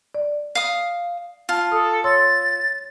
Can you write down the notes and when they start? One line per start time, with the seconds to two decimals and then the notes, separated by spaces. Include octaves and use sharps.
0.15 D5
0.55 F5 D#6
1.49 F4 A5 F6
1.72 A4 D#6
2.04 C#5 C6 E6 A6